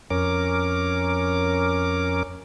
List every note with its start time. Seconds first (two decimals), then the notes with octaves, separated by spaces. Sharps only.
0.10 F2 C#4 A#4 D6